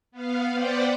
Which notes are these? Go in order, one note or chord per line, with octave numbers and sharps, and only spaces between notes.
B3 F5
B4 C5 D5 F#5 G5